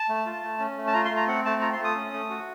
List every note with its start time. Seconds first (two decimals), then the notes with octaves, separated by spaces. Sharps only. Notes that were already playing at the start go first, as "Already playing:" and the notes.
Already playing: A5
0.09 A3
0.26 F4
0.43 A3
0.59 C#4
0.78 A3
0.87 A5
0.93 F4 A#5
1.05 C6
1.11 A3
1.16 A#5
1.27 C4 F#5
1.45 A3 A5
1.61 F4 A#5
1.73 C6
1.79 A3
1.84 D#6
1.96 C#4
2.13 A3
2.30 F#4